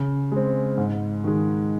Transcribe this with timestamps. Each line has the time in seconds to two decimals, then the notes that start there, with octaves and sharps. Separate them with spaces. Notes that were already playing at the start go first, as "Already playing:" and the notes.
Already playing: C#3
0.32 G#3 C4
0.78 G#2
1.24 D#3 G#3